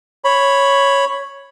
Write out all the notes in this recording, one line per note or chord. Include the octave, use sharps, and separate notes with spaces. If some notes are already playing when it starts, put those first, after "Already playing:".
C#5 B5